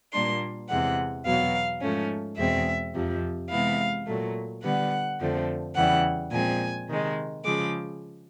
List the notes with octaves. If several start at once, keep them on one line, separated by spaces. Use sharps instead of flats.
A#2 G3 A#3 D4 C6
E2 C3 E3 G#3 F#5
E2 B2 F#3 B3 F5
G#2 F3 A3 C#4
E2 B2 G#3 C4 E5
F2 C3 F3
C3 E3 G#3 B3 E4 F5
A#2 F#3 A3
D3 G3 B3 F#5
F2 D3 F3 A3 C4
E2 C#3 E3 G3 F#5
A#2 F3 G#3 C4 G#5
C3 D#3 G#3
C#3 F3 G#3 D6